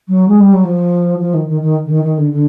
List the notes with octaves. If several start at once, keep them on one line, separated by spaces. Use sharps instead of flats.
F#3
G#3
G3
F#3
F3
F3
D#3
D#3
D#3
D3
D#3
D#3
D3
D3